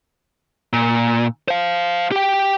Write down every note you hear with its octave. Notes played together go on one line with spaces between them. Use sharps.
A#2
C5 F5
G4 G5